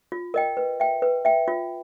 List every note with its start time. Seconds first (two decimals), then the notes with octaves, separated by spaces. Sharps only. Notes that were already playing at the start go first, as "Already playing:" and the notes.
0.12 F4
0.34 A#4 D#5 G5
0.57 B4
0.80 E5 G5
1.02 B4
1.25 E5 G5
1.48 F4